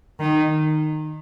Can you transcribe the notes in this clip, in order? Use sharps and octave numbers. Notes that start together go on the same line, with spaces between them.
D#3